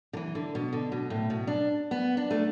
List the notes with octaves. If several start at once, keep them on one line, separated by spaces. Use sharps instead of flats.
D3
E3
D3
B2
D3
B2
A2
B2
D4
B3
D4
A3